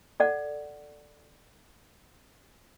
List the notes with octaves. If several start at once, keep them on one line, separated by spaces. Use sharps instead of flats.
A4 D5 F#5